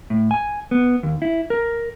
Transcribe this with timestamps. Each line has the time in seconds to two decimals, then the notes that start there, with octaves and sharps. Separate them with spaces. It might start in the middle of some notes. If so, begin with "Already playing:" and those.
0.10 A2
0.31 G#5
0.71 B3
1.03 D#2
1.22 E4
1.50 A#4